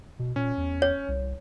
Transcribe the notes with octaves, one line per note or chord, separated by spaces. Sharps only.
B2
A#2 C#4
E2
C#5
C2